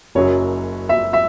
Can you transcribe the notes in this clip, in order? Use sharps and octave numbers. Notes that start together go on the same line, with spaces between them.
F#1 F#2 F#3 C#5
E5
E5